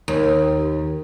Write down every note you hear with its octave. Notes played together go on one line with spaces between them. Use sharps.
D#2